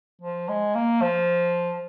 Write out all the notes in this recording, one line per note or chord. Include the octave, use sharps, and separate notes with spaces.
F3
G#3
A#3
F3